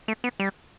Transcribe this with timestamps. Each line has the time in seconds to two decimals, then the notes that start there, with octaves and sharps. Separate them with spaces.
0.08 A3
0.24 B3
0.40 G3